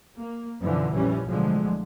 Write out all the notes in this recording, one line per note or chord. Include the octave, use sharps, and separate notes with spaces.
A#3
F#2 B2 D3 E3 F3
A#1 F2 E3 G3 C#4
B1 A2 D3 F3 F#3 G#3